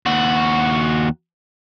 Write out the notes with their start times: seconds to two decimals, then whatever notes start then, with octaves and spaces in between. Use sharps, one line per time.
0.06 D#2 F#4